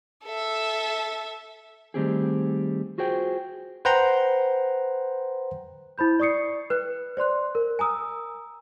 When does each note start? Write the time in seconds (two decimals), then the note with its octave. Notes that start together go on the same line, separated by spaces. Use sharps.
0.25 A4 E5
1.94 D#3 G3 A3 C4 G4 G#4
2.98 F4 F#4 G#4 C5 G5
3.85 B4 C5 F#5 G5 A#5 C6
5.98 E4 C5 B5 G6
6.20 D5 C#6 D#6 C7 C#7
6.70 B4 F#6
7.17 C5 D5 C6 F#6
7.55 A#4
7.79 G#5 A#5 D#6 E6